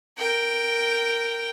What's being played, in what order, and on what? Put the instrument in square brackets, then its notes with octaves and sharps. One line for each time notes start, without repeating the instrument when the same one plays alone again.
[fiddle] A#4 G5